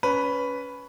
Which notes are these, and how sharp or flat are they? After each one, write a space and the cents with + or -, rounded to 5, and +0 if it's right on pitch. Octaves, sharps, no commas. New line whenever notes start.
C#4 +20 B4 +0